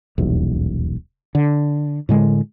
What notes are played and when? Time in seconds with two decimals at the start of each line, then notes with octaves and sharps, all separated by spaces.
0.18 D#1 B1 E2
1.35 D3
2.09 A2 D3 G#3